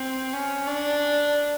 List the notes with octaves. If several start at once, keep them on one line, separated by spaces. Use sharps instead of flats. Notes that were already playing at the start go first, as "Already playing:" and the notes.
Already playing: C4
C#4
D4